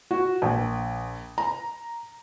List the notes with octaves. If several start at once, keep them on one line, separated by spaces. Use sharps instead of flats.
F#4
A#1
A#5